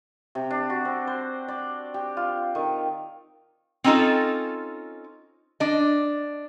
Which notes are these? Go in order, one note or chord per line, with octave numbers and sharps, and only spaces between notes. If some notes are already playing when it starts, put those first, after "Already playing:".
C3
D4
F#4
C4
C5
D5
G4
F4
D#3
C4 C#4 D#4 F4 A4
D4 D#5